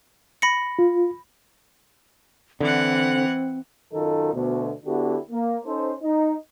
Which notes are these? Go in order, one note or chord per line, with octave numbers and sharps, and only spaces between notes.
B5 A#6 C#7
F4
D3 E3 C4 F#5
F#2 D#3 D#4 F4 A4
D2 B2
D3 B3 D4 E4 F#4 G4
A#3
C#4 D#4 A4 C5
D#4